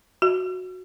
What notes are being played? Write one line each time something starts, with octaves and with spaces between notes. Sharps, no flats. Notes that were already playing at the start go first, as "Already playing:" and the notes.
F#4